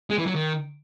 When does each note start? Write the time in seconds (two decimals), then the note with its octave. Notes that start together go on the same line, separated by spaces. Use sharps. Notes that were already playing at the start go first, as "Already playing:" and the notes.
0.10 G#3
0.18 E3
0.26 F#3
0.35 D#3